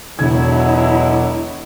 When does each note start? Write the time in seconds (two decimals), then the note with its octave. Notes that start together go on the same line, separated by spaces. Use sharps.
0.19 E1 B2 D3 F#3 E4 G#6